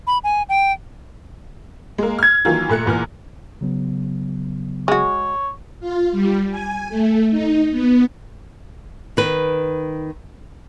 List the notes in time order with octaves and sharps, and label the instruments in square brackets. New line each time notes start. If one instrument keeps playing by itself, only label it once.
[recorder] B5
G#5
G5
[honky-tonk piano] G#3 A#3
F6 G#6
D#3 E3 F#3 A#3 F4
A#2 A3 F#6 C#7
E2 A#2 E3 F6
[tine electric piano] C#3 F#3 B3
[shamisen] G#3 F#4 [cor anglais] C#5
[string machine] F4
G3
G#5
A3
D#4
B3
[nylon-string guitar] D#3 B4